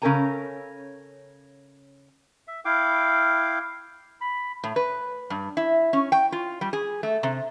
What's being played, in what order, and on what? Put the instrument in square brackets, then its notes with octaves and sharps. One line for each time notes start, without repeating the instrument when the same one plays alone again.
[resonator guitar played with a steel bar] C#3 C#4 A4 A#4 G#5 A#5
[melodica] E5
E4 F5 G5 D6
B5
[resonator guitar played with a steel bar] A2
B4
G2
E4
C#4
G5
F4
G3
G#4
A3
C3